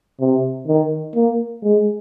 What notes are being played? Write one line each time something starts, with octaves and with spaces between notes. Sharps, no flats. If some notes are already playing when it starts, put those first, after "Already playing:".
C3
D#3
A#3
G#3